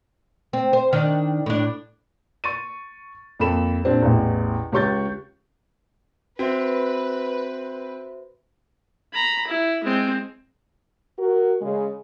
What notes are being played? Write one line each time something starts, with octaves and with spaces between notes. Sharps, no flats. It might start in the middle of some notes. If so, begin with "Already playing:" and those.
C4
C5
D#3 D4
A2 D4
C#6 A6 D#7
F2 A#3 A4 B5 E7
A#2 G3 C4 D4
A1 E2
C#2 G4 C#5 C#6 G6 A6
C4 F#4 B4 C5 E5
A#5 B5
E4
G#3 C4
F#4 A#4
C#3 G#3